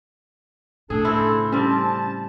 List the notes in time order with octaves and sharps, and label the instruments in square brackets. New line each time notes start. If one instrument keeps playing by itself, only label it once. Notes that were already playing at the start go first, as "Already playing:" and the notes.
[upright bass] A2 C#3 [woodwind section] D4 A4 [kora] G#4
[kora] C4 E4
[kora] G3 C4 [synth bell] C#4 [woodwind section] A5